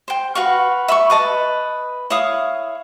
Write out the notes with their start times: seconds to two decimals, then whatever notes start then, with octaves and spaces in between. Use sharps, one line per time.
0.08 C5 G5
0.35 F#4 B4 F5 C#6
0.88 E5 B5 C#6
1.10 B4 D#5 A5
2.10 E4 C#5 F5 D#6